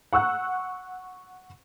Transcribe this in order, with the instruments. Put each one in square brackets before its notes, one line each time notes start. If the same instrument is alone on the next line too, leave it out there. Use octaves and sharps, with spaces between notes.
[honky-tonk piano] F#5 C#6 E6 F#6